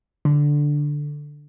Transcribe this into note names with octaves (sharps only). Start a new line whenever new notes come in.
D3